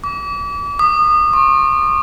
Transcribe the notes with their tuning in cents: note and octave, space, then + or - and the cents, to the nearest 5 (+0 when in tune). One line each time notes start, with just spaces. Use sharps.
D6 -35
D#6 -30
C#6 -35